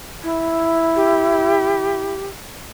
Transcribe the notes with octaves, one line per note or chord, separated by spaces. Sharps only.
E4
G4